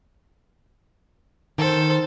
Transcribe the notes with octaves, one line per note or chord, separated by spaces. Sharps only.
D#3 A4 C5